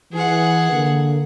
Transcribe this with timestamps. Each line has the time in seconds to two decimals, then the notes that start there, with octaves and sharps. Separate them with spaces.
0.13 E3 G#4 F#5
0.71 D3 A#3